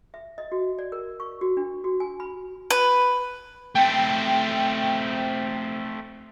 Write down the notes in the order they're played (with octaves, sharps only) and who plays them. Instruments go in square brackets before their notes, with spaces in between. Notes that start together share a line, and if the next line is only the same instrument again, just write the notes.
[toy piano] E5
D#5
F#4
D5
A#4
C#6
F#4
D4
F#4
G#5
B5
[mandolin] B4
[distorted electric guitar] A3 C4 [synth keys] G5